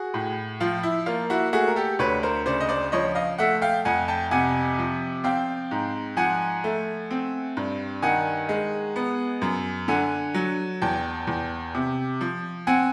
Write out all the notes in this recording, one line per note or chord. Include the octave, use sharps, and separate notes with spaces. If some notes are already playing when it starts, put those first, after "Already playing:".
Already playing: F#4 G#4
A2
F3 F4
E4
A#3 F4
E4 F#4
A3 F#4 G#4
A#4
G4 A4
D2 B4 C#5
A#4 C5
C#3 C5 D5
D#5
C5 D5
F3 C#5 D#5
D#5 F5
A3 E5 F#5
F5 G5
F2 F#5 G#5
G5 A5
C3 F#5 G#5
F3
C4 F5 G5
G#2
F3 F#5 G#5
A3
C4
G2
D#3 F#5 G#5
G#3
B3
F#2
D3 F#5 G#5
F#3
E2 G5 A5
E2
C3
F3
C4 F#5 G#5